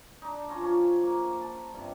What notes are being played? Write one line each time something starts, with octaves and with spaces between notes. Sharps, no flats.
D4 D#4
C#4 F4 A#5
F3 C#4
A#3
A5
G2 C3